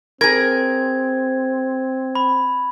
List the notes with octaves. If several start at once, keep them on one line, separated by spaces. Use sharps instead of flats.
C4 G#4 A#4 G#6
B5